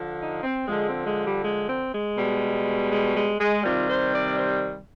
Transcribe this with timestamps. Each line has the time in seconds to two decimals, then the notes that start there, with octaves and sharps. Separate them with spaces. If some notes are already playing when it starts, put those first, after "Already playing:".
Already playing: D3 F3
0.18 D#4
0.42 C4
0.67 D3 F3 G#3
0.86 C4
1.04 G#3
1.23 G3
1.41 G#3
1.65 C4
1.90 G#3
2.15 B2 G3
2.88 G#3
3.13 G#3
3.38 G#3
3.62 C3 D#3 G3 F4
3.87 C5
4.12 D5
4.36 C5